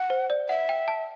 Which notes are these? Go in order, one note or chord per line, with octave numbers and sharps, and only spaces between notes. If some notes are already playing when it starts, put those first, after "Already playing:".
Already playing: F#5
C5
D5
E5 F#5
G5
A5